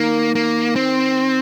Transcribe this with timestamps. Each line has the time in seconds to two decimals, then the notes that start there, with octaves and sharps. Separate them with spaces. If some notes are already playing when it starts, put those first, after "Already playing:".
Already playing: D#3 A#3
0.35 A#3
0.76 C4